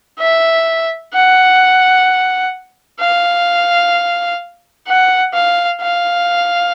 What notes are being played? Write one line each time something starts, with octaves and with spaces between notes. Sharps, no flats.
E5
F#5
F5
F#5
F5
F5